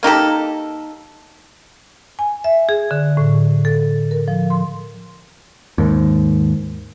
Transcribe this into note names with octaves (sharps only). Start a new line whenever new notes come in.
A#3 D#4 G4 A4
G#5
E5
G#4
D3
A2
A4
A#4
F3
C6
D#2 G#2